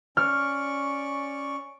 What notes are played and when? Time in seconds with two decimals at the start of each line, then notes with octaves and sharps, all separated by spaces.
0.17 C#4 D5 C#6 F6